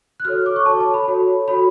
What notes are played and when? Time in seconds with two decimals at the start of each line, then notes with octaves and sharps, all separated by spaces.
0.20 F#6
0.25 F#4 A4 C#5 F6
0.46 D6
0.56 C#6
0.66 F#4 A4 C#5 A5
0.81 A5
0.94 B5
1.08 F#4 A4 C#5
1.48 F#4 A4 C#5 B5